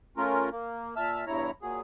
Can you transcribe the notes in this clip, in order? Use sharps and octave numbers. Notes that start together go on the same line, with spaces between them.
A3 C#4 F4 A#4
A#3
A#2 E5 A5 E6 F6
E2 G2 E4 C#5 A#5
A#2 F#3 G#4